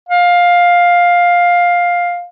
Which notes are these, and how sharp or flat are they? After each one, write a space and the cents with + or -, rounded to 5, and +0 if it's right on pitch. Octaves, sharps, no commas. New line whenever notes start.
F5 +10